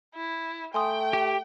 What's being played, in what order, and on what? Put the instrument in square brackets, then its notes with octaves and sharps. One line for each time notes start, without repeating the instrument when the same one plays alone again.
[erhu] E4
[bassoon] A3 [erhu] G5 [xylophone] G#5 C6 D#6
[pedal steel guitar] G4